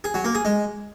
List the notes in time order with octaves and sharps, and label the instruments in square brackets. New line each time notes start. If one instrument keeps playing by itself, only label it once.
[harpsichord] G#4
F#3
A#3
G#4
G#3